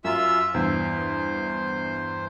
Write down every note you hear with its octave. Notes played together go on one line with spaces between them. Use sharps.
F#2 F4 E5 E6
E2 G2 C5